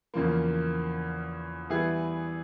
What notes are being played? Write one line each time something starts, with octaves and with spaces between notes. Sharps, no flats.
E2 C#3 F3 A#3
E3 G3 B3 E4 G#4